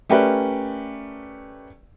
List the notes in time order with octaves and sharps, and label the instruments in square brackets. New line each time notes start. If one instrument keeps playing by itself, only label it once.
[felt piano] A3 C#4 G4 A#4 B4 D5